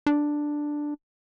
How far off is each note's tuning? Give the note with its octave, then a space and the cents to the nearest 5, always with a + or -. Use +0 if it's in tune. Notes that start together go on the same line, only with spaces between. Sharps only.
D4 +5